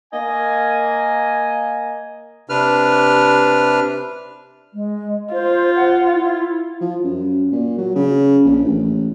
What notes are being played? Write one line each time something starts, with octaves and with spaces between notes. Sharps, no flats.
A#3 D#5 G#5
C3 D4 B4 F6
G#3
F4 C5
F#5
E4
F3
F#2
A#2
F#3
C#3
A#1
A1